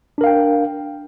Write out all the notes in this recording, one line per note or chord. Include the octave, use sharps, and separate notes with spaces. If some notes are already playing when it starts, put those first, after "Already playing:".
D4 A#4 F5 G5